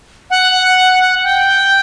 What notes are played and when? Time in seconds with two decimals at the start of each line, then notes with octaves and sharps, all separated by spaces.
0.30 F#5
1.24 G5